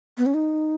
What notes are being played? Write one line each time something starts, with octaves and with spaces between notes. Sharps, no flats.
B3
C#4
D#4